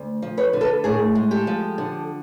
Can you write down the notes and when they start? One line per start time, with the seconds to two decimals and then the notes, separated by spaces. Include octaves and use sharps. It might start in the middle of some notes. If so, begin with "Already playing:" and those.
Already playing: D2
0.22 F3
0.37 B4 C#5
0.53 D3
0.61 A4 B4
0.84 A2 G#4 A#4
1.15 G#3
1.31 G4 A4
1.47 F3
1.78 D3